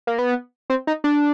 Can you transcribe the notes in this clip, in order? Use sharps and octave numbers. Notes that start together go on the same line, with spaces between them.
A#3
B3
C4
D#4
D4